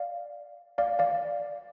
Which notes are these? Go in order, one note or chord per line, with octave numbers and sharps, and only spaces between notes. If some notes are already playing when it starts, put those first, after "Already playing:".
Already playing: D5 F5
D5 F5
D5 F5